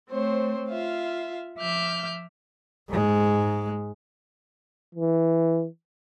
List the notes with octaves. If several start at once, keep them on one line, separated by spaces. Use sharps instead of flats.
A3 C4 C5 C#5
F4 E5 F5
F3 E5 D6 F6 G6
G#2 G#3
E3